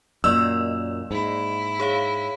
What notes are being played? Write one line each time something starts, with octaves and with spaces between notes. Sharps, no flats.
F#2 A#2 A#3 D5 D#5 E6
G#2 E4
G#4 C#5 F5